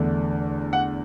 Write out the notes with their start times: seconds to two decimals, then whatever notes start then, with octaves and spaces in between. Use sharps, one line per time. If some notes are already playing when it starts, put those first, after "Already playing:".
Already playing: E2 D3 A3 D4
0.73 F#5